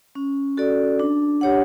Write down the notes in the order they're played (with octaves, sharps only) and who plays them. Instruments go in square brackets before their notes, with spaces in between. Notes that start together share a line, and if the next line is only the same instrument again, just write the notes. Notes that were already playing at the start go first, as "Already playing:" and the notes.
[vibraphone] C#4
F#4 A4 D5
D4
G4 C#5 F#5